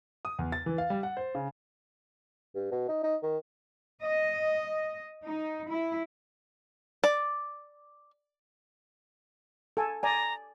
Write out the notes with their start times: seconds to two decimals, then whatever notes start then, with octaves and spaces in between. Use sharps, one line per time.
0.25 D#6
0.39 E2
0.52 A6
0.66 E3
0.78 F5
0.90 G3
1.03 F#5
1.17 C5
1.35 C#3
2.55 G2
2.71 B2
2.88 D#4
3.03 D#4
3.23 D#3
4.03 D#5
5.25 D#4
5.70 E4
7.04 D5
9.77 A4 G#5
10.03 D5 G#5 A#5